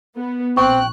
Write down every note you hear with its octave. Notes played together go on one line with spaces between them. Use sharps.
B3
A#1 C4 G5 C#6 F#6